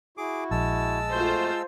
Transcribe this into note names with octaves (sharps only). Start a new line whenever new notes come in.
E4 F#4 G#4 D6
A#1 G#3 A5 E6
F2 A3 F4 F#4 C5